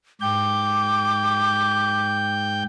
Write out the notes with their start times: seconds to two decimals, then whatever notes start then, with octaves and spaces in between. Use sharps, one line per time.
0.21 G#2 G5 D6 G6